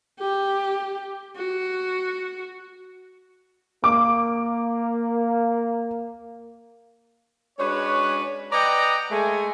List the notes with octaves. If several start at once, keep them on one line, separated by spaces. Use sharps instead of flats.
G4
F#4
A#3 D6
G#3 C#4 D4 F#4 B4 C#5
B4 D5 D#5 F#5 G5 A#5
G#3 A3 G#5